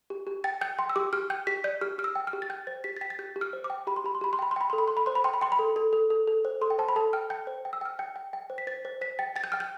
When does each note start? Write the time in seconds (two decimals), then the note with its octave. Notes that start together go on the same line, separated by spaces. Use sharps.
0.10 G4
0.27 G4
0.44 G5 A6
0.61 G5 G6
0.79 G5 C6
0.89 E6
0.96 G4 D6
1.13 G4 F6
1.30 G5 G6
1.47 G4 B6
1.64 D5 G6
1.81 G4 F6
1.98 G4 F6
2.04 E6
2.15 G5
2.27 F6
2.33 G4
2.42 A6
2.50 G5 G6
2.67 C5 A6
2.84 G4 B6
2.97 A6
3.01 G5 B6
3.10 A6
3.19 G4 G6
3.36 G4
3.41 F6
3.53 C5
3.64 D6
3.70 G5
3.87 G4 B5
3.96 C6
4.04 G4 B5
4.15 C6
4.21 G4 B5
4.33 C6
4.39 G5 B5
4.51 C6
4.56 G5 B5
4.70 A4 C6
4.78 B5
4.88 A4 C6
4.97 B5
5.06 C5 C6
5.15 B5
5.24 G5 C6
5.34 B5
5.41 G5 C6
5.52 B5
5.59 A4
5.76 A4
5.93 A4
6.10 A4
6.28 A4
6.45 C5
6.61 A4 C6
6.70 G5
6.78 C5 A5
6.88 B5
6.96 A4 A5
7.13 G5 F6
7.30 G5 G6
7.47 C5
7.65 G5
7.73 E6
7.81 G5 F6
7.99 G5 G6
8.16 G5
8.33 G5
8.50 C5
8.58 B6
8.67 C5 A6
8.85 C5
9.01 C5 B6
9.19 G5 A6
9.36 G5 A6
9.44 G6
9.52 G5 F6
9.60 G6